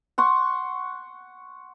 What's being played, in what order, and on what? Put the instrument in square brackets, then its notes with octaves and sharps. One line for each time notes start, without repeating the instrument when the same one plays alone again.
[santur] F#5 C6 C#6